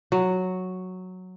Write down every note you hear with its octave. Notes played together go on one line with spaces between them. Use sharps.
F#3